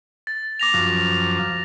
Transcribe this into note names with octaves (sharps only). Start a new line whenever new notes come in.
A6
D6 A#6 F7
F#2 F3